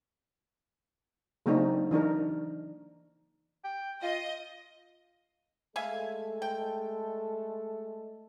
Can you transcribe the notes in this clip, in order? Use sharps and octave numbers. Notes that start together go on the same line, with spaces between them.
C#3 F#3 A#3 C4 D4 D#4
E3 D4 D#4 A#4
G5
F4 D#5
G#3 A3 A4 E5 F5 G#5
G5